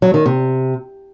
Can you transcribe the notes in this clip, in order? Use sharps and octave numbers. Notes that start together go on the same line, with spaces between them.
F#3
D#3
C3